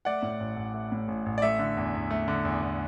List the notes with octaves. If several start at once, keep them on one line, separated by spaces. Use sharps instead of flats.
A3 D5 F#5
A2
A1
A1
A3
A2
A1
A1
D5
A3 E5
D3
E2
E2
A3
D3
E2
E2